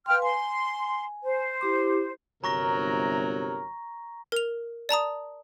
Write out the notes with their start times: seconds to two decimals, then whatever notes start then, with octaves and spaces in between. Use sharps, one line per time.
0.06 B4 F5 G5 C6 F6
0.22 G#5 C6
1.23 C5
1.61 E4 G4 D6
2.44 G1 C3 F#3 A#4 A#5 C#6 A#6
4.32 A#4 F7
4.89 D5 A5 A#5 D#6